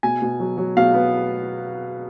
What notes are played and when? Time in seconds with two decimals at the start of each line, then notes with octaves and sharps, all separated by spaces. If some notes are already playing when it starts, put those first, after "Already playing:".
0.03 B2 G#5
0.22 B2
0.40 F#3
0.58 F#3
0.77 B2 F5
0.94 B3